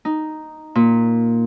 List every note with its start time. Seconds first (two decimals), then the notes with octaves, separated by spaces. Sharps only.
0.05 D#4
0.75 A#2